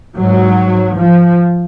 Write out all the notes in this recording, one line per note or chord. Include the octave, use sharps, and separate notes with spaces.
G#2 F#3
F3